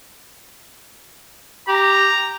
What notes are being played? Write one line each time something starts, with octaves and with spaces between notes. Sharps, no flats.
G4 A#5